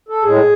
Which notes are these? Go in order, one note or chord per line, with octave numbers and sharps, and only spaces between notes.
A4
A2 G#3 G#4